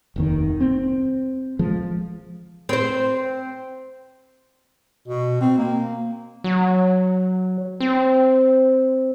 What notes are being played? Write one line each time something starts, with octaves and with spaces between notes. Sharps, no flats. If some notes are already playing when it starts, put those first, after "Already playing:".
F1 D#2 D#3
C4
F3 G#3
C4 C5
B2
C4
A#3
F#3
C4